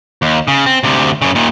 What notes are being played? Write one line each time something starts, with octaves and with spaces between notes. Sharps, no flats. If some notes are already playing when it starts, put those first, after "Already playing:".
D#2
C#3
C4
D2 C3
F#2 C#3
D#2 A#2